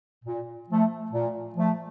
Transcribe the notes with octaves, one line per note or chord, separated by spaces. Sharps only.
A#2
F3 A3
A#2
F3 A3